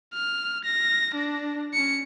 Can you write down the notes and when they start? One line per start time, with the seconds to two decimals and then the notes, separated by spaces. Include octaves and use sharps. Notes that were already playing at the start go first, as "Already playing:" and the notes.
0.14 F6
0.65 A#6
1.15 D4
1.74 C#4 C#7